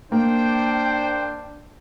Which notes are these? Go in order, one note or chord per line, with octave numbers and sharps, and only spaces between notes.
A#3 D4 C5 G5